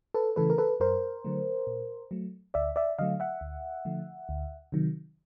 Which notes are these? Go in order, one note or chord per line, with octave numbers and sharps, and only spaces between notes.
A4 B4
C#3 E3 A3 A4 B4
A#4
A4 B4
F#2 A#4 C5
D3 F#3 A3
A#2
F#3 A3
D2 D5 E5
D5 E5
D3 F#3 A3 D#5 F5
E5 F#5
D2
D3 F3 A3
D2
C3 D#3 F#3